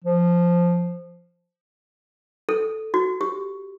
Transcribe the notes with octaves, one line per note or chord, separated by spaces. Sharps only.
F3
A4
F#4
G4